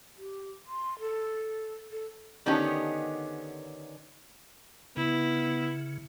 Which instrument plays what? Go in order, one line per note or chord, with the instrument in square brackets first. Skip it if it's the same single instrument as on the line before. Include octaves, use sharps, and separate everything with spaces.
[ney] G4
C6
A4
A4
[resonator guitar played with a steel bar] D3 D#3 B3 C#4 D#4 G4
[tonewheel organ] C#3 [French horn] B3 [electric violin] E4